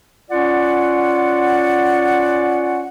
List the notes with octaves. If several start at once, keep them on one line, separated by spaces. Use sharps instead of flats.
C#4 F4 D5 F#5